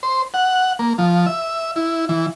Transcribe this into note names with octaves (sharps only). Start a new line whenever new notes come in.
C5
F#5
A#3
F3
E5
E4
E3